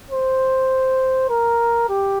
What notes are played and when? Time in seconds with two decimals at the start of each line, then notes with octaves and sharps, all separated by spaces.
0.11 C5
1.30 A#4
1.90 G4